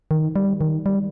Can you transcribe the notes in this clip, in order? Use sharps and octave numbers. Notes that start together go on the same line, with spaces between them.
D#3
G3
D#3
G3